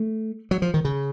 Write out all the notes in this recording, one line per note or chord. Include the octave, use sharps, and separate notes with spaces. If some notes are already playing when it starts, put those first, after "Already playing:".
Already playing: A3
F#3
F3
D#3
C#3